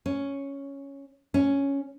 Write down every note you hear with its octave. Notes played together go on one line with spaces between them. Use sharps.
C#4
C#4